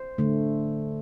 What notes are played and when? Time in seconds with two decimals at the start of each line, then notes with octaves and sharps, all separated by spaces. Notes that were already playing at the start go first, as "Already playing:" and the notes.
Already playing: C5
0.18 D3 A3